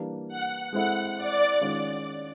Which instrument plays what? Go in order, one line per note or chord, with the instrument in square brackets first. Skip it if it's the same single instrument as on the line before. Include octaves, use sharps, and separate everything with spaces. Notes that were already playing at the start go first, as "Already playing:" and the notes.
Already playing: [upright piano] E3 G3 A#3 D4
[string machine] F#5
[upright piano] G#3 C4 E4 A4 [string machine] F#5
[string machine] D5
[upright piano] D#3 G#3 C#4 F4